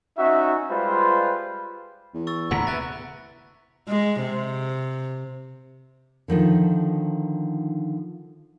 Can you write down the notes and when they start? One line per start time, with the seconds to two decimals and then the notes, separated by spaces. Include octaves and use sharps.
0.18 C#4 D#4 F#4 E5
0.71 G3 G#3 F4 B4 C5 F5
2.14 E2
2.27 C#6 E6 A6
2.51 D2 A2 C3 F#5 G#5 A#5 B5 B6
2.67 C3 B3 E5 A#5 F#6 A6
3.88 G#3
4.22 C3
6.28 D3 D#3 F3 D#4